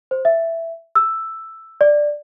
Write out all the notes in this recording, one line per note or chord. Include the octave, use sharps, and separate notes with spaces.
C5
E5
E6
D5